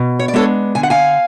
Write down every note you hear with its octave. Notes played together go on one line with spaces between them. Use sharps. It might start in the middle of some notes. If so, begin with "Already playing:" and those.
Already playing: B2
C#5
D5
G#3 B3 D4 A4 C#5
D3 G#5
F#5
F5 G#5